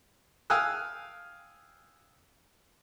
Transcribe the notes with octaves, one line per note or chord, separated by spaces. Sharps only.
F5 G5 G#5 D#6 E6 F#6